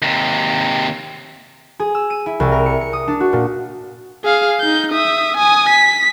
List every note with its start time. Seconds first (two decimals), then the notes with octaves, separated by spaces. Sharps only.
0.02 D#2 C3
1.80 G#4
1.95 E6
2.10 D#7
2.26 E4
2.40 C2
2.52 A#4
2.66 C#7
2.81 C#7
2.93 D#6
3.08 D4
3.20 F#4
3.33 A#2
4.24 G#4 F5
4.60 D#4 G6
4.92 E5 D#6
5.37 G#5 D#6
5.69 B6